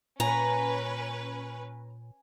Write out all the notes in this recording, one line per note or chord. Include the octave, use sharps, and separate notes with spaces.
A#2 C#4 B4 G#5 A#5